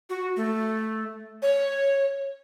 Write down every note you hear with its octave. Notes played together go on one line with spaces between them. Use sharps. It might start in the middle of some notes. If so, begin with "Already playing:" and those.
F#4
A3
C#5